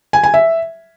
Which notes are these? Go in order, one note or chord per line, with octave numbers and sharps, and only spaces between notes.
G#5
G#5
E5